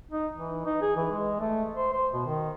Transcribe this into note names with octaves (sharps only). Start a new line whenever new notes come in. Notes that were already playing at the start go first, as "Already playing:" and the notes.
D#4
E3
D#4
G#4
E3
G#3
A3
C5
C5
B2
D#3